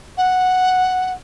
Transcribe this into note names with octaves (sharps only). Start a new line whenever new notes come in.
F#5